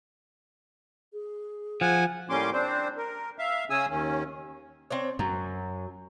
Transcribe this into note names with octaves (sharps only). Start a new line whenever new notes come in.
G#4
F3 F#5 G#5
A2 G3 A#3 C#4 C6 D6
C4 D4 C5
A#4
E5 F5
C#3 C#4 G#4 G#5 D#6 E6
D#2 D#3 C#4
C4 D4 C#5
F#2 F#3